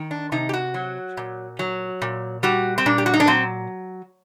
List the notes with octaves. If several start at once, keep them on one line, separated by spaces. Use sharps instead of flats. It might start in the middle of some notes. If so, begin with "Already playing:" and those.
Already playing: D#3
D4
C3 D#4
G4
F#4
F#3
A#2
F#3
A#2
G3 F#4
C4
A#2 D4
G4
F#4
D#4
D4
F#3 C4